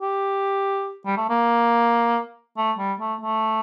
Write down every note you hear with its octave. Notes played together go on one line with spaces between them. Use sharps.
G4
G3
A3
A#3
A3
G3
A3
A3